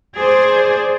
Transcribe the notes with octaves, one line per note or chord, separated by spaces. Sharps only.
G#4 C5 D5